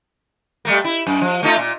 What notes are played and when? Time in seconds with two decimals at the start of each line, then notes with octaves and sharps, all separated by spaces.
0.65 G3 A3 A#3
0.84 E4
1.07 F#2
1.21 F3
1.43 A3 D#4 F4
1.57 A#2